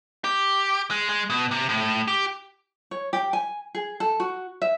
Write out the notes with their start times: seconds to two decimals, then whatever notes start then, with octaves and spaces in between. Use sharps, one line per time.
0.24 G4
0.91 G#3
1.09 G#3
1.30 B2
1.51 C3
1.69 A2
2.08 G4
2.91 C#5
3.13 G4
3.33 G#5
3.75 G#4
4.00 A4
4.20 F#4
4.62 E5